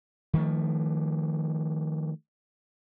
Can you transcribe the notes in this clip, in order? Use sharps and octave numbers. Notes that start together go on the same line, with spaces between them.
D#3 F3 A3